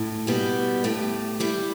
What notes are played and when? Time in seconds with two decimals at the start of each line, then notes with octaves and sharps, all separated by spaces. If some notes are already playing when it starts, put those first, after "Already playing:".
Already playing: A2
0.27 B2 G3 B3 G4
0.84 A2 A3 G4
1.40 G3 E4 G4